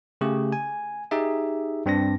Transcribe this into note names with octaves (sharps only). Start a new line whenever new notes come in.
C#3 A3 G4
G#5
D#4 G4 G#4 E5
G2 C4 D4 A#6